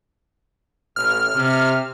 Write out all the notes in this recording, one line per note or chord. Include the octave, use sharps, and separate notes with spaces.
A1 F6
C3